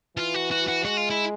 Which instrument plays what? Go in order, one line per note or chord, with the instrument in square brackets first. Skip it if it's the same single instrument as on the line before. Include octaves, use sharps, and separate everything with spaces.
[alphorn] E3 [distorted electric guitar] F4
[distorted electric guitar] F#4
F#4
F#4
[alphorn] G#3 [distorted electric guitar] F#4
[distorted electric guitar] F4
E4